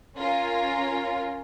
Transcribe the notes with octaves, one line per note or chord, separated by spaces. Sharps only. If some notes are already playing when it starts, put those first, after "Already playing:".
C#4 F4 A#4